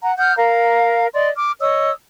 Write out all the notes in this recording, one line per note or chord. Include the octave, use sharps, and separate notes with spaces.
F#5 A#5
F#5 D#6 F6 G6
A#4 F5 A#5
D5 D#5 C6
D6 F6
C#5 D#5 D#6 E6